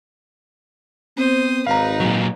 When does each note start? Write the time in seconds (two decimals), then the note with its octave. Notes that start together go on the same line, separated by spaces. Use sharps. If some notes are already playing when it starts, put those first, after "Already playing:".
1.17 B3 C4 C5 D#6
1.67 G#1 D#4 B4 F5 A#5
2.00 A#2 F#3